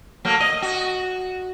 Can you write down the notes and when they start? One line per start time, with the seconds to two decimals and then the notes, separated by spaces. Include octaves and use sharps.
0.25 F#3 A3 A#3
0.40 D#5
0.62 F#4